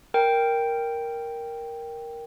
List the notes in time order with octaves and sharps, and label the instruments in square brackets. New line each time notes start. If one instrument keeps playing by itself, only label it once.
[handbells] A#4 G5